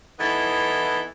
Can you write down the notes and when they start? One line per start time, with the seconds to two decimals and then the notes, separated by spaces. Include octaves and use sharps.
0.19 E3 B3 D#4 E4 A4